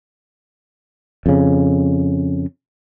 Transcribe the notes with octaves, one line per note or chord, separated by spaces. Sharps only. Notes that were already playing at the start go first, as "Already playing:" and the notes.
F2 C#3